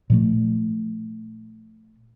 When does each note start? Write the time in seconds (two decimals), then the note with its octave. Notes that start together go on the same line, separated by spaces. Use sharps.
0.10 A#2 F3 A3